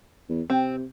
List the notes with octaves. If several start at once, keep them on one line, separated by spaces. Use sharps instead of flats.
E2
C3 C4